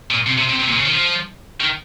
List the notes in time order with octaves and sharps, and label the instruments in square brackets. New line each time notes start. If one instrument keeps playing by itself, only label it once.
[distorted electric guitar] A#2
C3
C3
C3
C3
A#2
C#3
D#3
F3
D#3